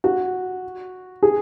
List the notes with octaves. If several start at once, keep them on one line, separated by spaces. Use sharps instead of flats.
F#4
G#4